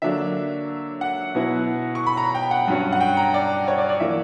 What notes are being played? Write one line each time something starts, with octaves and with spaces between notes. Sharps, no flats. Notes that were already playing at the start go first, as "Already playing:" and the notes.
D3 F#3 A#3 D4 E5
F#5
B2 F#3 B3 E4
C#6
B5
A#5
G5
F#5
G2 F#3 C#4
F#5
G5
A#5
D5
C#5
D5
D5
E3 A#3 E5